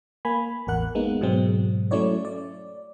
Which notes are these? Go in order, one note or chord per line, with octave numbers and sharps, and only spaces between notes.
A#3 G#5 B5
A1 E2 A#4 F#5 F#6
G#3 A#3 B3 D#4
G#2 B2 F#3 G#3 C4
F#3 A3 C#4 E4 C#5 D5
D5